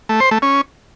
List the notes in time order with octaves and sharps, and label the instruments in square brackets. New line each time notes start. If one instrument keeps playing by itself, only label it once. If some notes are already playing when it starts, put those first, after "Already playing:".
[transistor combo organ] A3
C5
A3
C#4